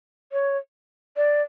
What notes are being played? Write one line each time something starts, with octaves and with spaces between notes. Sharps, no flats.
C#5
D5